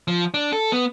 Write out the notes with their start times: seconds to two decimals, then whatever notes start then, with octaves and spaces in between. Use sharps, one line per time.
0.08 F3
0.34 D4
0.53 A4
0.72 B3